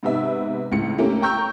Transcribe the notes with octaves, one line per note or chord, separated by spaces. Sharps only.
G#2 C3 B3 D#4 E5
C#2 A2 C#7
A3 A#3 C#4 E4 G4
G5 A#5 C#6 E6 G6